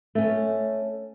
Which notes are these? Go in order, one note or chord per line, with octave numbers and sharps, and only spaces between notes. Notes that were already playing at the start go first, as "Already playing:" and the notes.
A3 C#4